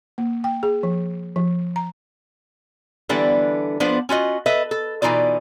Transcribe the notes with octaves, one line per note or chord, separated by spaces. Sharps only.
A#3
G5
G#4
F3
F3
A#5
D3 E3 G3 B3 D4 A4
F3 B3 D4 C5
C#4 F4 F#4 D#5
A4 B4 D#5 E5
A4
B2 E3 D#4 F4 D5